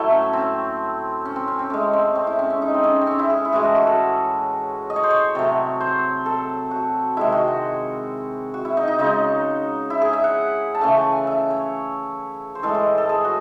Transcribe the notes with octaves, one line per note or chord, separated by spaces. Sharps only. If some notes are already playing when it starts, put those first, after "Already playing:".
Already playing: A2 F#3 A3 E4
C#4
C4
C#4
C4
C#4
C4
A2 G#3 C#4
C4
C4
E4
C#4
C#4
D#4
C4
C#4
C4
C#4
E4
G#4
E4
A2 E3 G#3 F#4
F#4
F#4
A4
D#5
C#5
C5
C#5
C3 F#3 A3
C5
A4
F#4
C3 D#3 G#3 E4
F#4
F#4
F#4
E4
D#4
D#4
C#3 G#3 D#4
E4
G#4
E5
F#5
A5
C#3 E3 A3 G#5
A5
G#5
E5
C#5
C5
A2 E3 G#3 A4
A4
A4
G#4
F#4